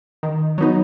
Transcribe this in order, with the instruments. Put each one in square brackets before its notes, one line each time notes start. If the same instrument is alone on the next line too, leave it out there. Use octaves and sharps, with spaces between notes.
[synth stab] D#3
F#3 B3 D#4